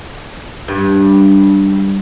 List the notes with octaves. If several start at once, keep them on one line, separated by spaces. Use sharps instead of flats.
G2